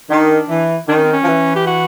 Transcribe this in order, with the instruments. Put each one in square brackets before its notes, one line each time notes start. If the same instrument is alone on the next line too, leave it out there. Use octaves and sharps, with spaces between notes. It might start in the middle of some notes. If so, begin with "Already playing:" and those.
[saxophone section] D#3 [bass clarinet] D4
[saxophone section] E3
[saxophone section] D#3 [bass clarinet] D4
[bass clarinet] C#4
C4
C#4
[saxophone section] F3
E3
[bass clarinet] G4
F#4